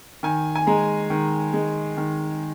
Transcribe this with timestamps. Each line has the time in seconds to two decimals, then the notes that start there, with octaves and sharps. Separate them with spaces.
0.23 D#3 G#5
0.55 G#5
0.67 G#3 A#5
1.10 D#3
1.53 G#3
1.97 D#3